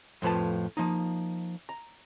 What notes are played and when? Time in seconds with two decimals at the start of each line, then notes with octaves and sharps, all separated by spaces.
0.22 F2 A2 F3 B4 A5
0.77 F3 A#3 D#4
1.69 A#5